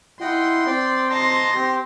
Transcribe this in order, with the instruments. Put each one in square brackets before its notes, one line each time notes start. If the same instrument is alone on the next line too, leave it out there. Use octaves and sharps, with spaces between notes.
[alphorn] E4 [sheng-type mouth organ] D#5 F#5 G5 [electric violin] C6
[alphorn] C4 [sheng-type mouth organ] D5 G5
[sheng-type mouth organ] D#5 A5 A#5 [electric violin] C6 A#6
[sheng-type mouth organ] C4 G4